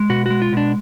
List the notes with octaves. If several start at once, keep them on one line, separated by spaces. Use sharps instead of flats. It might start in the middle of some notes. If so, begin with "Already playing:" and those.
Already playing: G#3
B2 F#4
G#3 F#4
F4
B2 D4